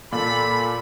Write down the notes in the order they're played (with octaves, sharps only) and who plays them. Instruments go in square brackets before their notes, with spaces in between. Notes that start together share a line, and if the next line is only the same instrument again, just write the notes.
[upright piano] A#2 [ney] A4 [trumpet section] B5